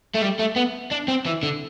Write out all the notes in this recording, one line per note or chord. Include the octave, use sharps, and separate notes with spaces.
A3
G3
A3
B3
D4
C4
E3
D3